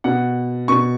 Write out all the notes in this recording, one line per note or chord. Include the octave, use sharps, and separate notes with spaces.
B2 F#5
B2 C#6